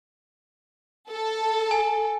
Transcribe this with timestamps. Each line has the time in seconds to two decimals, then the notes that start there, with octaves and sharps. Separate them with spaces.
1.11 A4
1.71 G#5